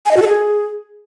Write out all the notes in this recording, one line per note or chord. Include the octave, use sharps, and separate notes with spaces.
G#5
D#5
F#4
A4
G#4